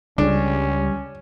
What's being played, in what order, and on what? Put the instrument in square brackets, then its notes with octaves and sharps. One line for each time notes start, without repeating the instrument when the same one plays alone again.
[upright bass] C#2 [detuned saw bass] G3 [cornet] C#4 [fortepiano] D4